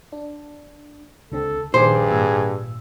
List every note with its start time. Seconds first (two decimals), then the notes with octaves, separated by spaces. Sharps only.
0.12 D4
1.32 C#2 D3 C4 A4
1.74 A#1 G2 D#3 G#4 C5 D6
2.10 G#1 A#2 E6